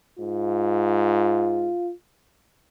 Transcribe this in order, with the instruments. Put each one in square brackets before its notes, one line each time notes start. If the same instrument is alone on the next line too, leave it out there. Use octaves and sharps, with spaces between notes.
[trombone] G#2 [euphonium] F4